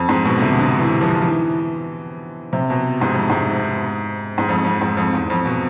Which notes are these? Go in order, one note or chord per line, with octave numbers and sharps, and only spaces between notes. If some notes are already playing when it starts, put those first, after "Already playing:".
Already playing: F2
G#2
B2
D3
C3
D3
E3
F3
E3
C3
B2
G#2
F2
G#2
G#2
F2
F2
G#2
F2
E2
F2
B2